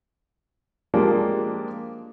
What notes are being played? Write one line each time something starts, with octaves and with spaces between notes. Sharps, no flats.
F3 G#3 A#3 D4 F4 G4